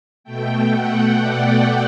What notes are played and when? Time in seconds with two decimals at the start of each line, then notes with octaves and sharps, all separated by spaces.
0.24 B2 A3 G5
0.71 F#5
1.19 D5
1.50 D5